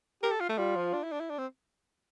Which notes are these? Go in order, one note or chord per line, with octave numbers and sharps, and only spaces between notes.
G4 A#4
A4
F4
A3
G3 F4
F3
D4
E4
D4
E4
D4
C4